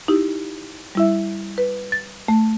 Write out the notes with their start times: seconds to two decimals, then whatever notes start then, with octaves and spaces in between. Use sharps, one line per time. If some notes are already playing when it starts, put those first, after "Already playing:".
0.08 D#4 E4 G4
0.95 G3 E4 E5
1.58 B4
1.92 A6
2.28 A3